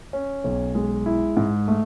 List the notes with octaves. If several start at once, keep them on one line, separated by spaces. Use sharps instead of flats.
C#4
B1
G#3
E4
G#2
A3